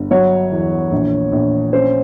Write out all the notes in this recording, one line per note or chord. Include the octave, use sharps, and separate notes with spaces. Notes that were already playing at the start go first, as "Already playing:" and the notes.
Already playing: G1
F#3 C#5
E2
A#1
A#1
C#4 C5